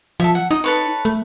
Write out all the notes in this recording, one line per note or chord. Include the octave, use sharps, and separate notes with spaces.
F3 A4 E5
F#5
D#4 D#5
A4 B4 C#5
A3